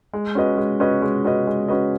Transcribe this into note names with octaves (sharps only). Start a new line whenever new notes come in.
G#3
C#4 F#4 B4 D#5
G#3
C#4 F#4 B4 D#5
G#3
C#4 F#4 B4 D#5
G#3
C#4 F#4 B4 D#5